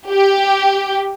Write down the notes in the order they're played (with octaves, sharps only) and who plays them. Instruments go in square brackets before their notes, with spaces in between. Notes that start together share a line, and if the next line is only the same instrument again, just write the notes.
[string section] G4